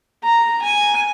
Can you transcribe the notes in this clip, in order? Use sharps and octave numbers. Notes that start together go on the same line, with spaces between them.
A#5
G#5